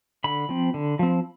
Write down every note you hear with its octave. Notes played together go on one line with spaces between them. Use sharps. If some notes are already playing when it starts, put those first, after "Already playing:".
D3 B5
F3 C4
D3
F3 C4